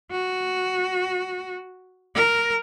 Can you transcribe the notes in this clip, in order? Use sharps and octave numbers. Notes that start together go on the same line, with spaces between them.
F#4
A#4